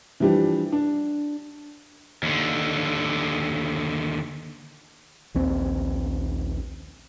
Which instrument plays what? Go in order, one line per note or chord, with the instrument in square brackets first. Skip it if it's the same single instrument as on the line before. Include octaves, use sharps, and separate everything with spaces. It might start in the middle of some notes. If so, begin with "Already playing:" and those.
[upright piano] E3 F3 G3 D4 G4
D4
[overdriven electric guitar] D#2 D3
[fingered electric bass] A#1 D#2 C4